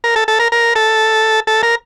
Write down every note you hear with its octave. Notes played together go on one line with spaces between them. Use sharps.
A#4
A4
A4
A#4
A#4
A4
A4
A#4